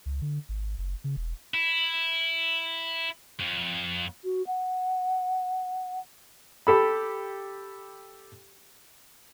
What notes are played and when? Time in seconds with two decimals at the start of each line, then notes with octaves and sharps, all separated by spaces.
0.06 C#2
0.22 D3
0.49 G#1
0.78 F#1
1.04 C#3
1.17 E1
1.54 E4
3.40 F2
4.24 F#4
4.47 F#5
6.67 G4 A4 B5